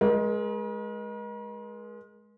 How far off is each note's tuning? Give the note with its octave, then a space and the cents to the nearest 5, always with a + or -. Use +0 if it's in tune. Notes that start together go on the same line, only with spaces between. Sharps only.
G#3 +15 A#4 +45 D#5 +0